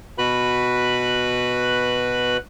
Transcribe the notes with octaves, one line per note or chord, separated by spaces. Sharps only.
B2 F#4 B4 B5 F#6